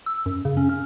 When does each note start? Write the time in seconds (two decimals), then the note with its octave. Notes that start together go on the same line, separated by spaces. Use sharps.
0.06 E6
0.26 F#2
0.45 C#3
0.57 C#4
0.69 F6